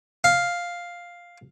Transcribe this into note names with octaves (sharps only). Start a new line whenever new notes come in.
F5